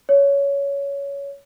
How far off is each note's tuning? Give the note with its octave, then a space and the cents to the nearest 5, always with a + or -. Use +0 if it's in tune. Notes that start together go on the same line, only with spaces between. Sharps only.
C#5 +15